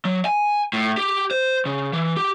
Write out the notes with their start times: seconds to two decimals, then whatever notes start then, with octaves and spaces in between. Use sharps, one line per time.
0.05 F#3
0.25 G#5
0.73 A2
0.98 G4
1.31 C5
1.65 C#3
1.93 E3
2.17 G4